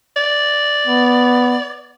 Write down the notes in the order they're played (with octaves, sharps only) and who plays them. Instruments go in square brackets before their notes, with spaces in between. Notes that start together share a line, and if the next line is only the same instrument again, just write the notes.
[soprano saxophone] D5
[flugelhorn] B3